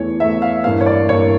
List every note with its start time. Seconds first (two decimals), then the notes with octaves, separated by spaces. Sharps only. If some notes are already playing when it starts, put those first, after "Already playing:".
Already playing: E2 E3 A3 C#5
0.20 E2 E3 A3 E5
0.42 F5
0.64 G2 E3 A#3 F5
0.81 C#5
0.86 D5
1.09 G2 E3 A#3 C#5